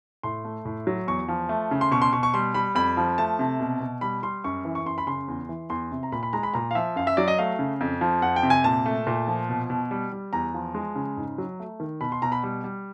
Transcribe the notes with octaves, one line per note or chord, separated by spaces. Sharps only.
A2 C6
A3
A2
F#3
E2 C#6
F3
A3
C#3
C6
B2 C#6
C6
B2 C#6
C#6
G3 C6
G3 B5
F2 B5
F3
A3 A5
C3
B2
B2
G3 B5
G3 C6
F#2 C#6
E3
C#6
F#2 C6
B5
C#3 C6
E2
E3
E2 C6
C3
A#5
A#2 B5
B5
G#3 A#5
B5
A#2 A#5
F5
F3 E5
F#2 F5
E5
F#3 D5
D#5
A3 F5
C#3
F2
F3
F2 F#5
G5
C3
G#5
A#2 A5
A3
A#2
F3
B2
B2
G3
G3
E2 A#5
F3
G#3
C#3
G#2
F#3
A3
D#3
B2 B5
C6
B2 A#5
B5
G3
G3